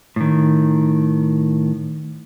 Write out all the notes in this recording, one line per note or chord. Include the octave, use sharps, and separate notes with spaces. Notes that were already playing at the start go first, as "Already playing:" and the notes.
A2 D#3